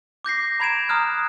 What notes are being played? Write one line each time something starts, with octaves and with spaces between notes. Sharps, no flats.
D6 G6 A#6 C7
A#5 B5 G#6 D7 E7
A#5 D#6 F6 F#6